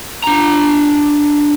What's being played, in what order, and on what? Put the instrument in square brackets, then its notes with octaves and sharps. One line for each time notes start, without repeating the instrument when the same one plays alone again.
[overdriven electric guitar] D4 A#5